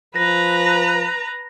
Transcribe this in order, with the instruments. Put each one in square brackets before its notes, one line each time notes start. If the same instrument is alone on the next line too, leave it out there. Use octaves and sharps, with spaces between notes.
[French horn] F3 [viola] B4 A#5 [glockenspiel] A#6